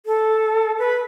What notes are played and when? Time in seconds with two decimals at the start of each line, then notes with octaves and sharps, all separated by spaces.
0.06 A4
0.79 B4